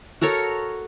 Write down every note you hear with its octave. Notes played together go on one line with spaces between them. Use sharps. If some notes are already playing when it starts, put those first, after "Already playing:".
F#4 A4 A#4 C#5